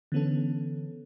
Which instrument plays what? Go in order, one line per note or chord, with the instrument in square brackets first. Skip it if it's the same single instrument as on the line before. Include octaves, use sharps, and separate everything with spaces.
[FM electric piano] D3 E3 B3 C#4 A4